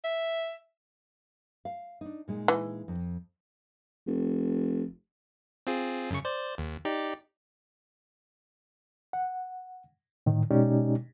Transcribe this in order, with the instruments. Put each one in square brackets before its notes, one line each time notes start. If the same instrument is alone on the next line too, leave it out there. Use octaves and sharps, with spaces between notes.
[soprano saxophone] E5
[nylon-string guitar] F5
D4 D#4
A#2 G#3 D#4
[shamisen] E3
[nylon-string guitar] F2
[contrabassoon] F1
[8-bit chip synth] C4 F4 G#4
F#2 C#3 C#6
C5 D5
D#2
D#4 G4 D5
[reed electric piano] F#5
A2 D#3
B2 G#3 C#4 D#4 G4 D5